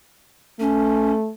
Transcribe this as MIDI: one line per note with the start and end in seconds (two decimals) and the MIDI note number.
0.60 1.31 57
0.60 1.12 61